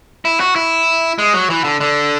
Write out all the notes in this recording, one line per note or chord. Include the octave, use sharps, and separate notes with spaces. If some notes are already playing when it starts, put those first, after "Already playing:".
E4
F#4
E4
G#3
F#3
E3
D3
D3